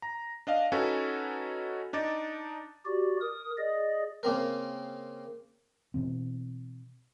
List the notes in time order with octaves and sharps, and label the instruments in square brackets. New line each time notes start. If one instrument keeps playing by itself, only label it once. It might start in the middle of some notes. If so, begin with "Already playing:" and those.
[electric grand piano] A#5
D4 D#5 F5
C#4 D#4 F#4 A4 B4 G#5
D4 D#4 D6 A6
[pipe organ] F#4 G4 D5
A#4 D#6
G#4 D5 D#5
[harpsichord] C#3 A#3 C4 A#4
[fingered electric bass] B2 E3 C4